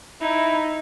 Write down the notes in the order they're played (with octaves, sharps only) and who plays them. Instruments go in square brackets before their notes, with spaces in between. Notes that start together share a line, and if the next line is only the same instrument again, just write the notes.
[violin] D#4 [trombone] E4